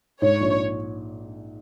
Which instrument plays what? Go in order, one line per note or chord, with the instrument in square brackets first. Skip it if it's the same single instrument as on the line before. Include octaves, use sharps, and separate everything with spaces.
[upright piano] G#2 [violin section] C#5
[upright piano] A#1